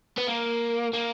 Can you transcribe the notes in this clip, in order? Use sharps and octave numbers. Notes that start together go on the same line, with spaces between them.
B3
A#3
A#3